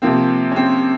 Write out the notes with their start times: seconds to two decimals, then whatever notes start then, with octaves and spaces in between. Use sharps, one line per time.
0.02 C3 F3 A#3 C4
0.51 C#4
0.56 C4